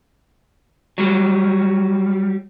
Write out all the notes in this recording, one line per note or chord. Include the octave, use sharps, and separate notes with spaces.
F#3 G3